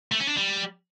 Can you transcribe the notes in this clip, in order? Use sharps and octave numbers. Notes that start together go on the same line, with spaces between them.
A3
C#4
D4
G3